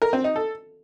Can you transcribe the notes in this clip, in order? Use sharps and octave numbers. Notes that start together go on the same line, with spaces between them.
A#4
C4
D#4
A4